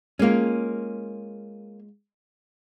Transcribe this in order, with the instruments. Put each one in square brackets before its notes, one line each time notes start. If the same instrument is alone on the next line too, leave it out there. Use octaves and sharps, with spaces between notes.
[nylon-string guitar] G#3 F4 [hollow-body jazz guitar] A#3 C#4